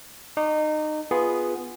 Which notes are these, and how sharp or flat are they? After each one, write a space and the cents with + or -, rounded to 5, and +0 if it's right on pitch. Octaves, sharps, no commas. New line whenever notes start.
D#4 -25 D6 -35
B3 +0 F4 +0 G#4 +0